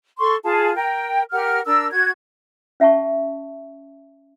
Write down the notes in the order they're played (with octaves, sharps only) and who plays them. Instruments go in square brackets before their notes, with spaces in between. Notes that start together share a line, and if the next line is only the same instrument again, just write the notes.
[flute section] A4 C6 C#6
F4 G#4 A5
A#4 G5
G4 A#4 F#5 F6
D4 A#4 E6
F#4 G#6
[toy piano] C#4 E5 F#5 A5 C#6